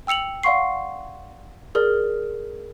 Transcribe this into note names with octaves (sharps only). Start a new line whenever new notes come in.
G5 E6 C#7 F7 F#7
D5 F5 F#5 C6 C#6 C7
G#4 A#4 D5 F6